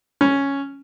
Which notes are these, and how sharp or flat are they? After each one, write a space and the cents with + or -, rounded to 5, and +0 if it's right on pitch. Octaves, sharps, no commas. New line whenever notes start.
C#4 +0